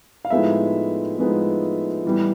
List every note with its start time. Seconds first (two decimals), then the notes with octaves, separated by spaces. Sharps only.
0.25 F5
0.30 A2 F3 G#3 B3 D#4 E5
1.18 A2 F3 G#3 B3 D#4
2.05 A2 E3 G3 B3